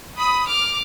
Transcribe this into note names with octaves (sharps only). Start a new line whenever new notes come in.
B5 D#6
D6 F6